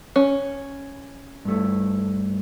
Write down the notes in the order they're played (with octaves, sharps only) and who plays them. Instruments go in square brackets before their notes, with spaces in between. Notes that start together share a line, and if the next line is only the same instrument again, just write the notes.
[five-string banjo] C#4
[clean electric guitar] G2 A3